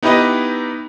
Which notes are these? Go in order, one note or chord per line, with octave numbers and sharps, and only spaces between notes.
B3 D#4 E4 G4 B4 D#5